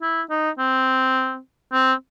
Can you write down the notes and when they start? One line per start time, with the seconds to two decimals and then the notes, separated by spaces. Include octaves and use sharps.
0.02 E4
0.30 D#4
0.58 C4
1.73 C4